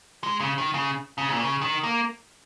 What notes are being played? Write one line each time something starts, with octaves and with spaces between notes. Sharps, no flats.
G#3
C#3
D#3
C#3
C#3
A#2
C#3
D#3
A#3